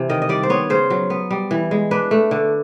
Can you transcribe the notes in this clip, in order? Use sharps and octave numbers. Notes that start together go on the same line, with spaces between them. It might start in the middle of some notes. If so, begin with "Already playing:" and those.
Already playing: C3 E3
D#3 D#5
D#5
G3 D5
C5
B3 C#5
C#3 C5
F#3
B3
G3
E3
G#3
D4 B4
A3
D3